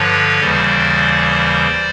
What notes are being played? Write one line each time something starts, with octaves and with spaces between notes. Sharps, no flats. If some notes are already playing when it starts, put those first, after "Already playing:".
Already playing: G2 D3 F3 B4 C#5
D#2 C#3 E3 G3 C5 D5